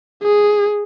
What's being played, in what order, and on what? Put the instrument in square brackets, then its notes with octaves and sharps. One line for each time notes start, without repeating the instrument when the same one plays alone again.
[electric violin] G#4